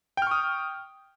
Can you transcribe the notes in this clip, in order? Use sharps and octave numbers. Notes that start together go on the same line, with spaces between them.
G5 C#6 D#6 F6